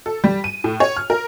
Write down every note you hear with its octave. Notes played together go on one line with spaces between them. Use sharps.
A4
G3
D#7
A2
C#5
F6
A#4